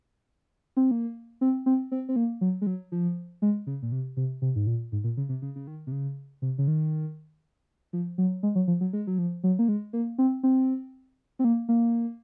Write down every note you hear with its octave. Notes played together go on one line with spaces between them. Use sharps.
C4
A#3
C4
C4
C4
C4
A#3
F#3
G#3
F#3
F3
G#3
C#3
A#2
C3
C3
C3
G#2
A#2
G#2
A#2
C#3
C3
C#3
C#3
D#3
C3
C#3
C3
C#3
D#3
F3
F#3
G#3
F#3
F3
F#3
G#3
F#3
F3
F#3
A#3
G#3
A#3
C4
C4
C4
A#3
A#3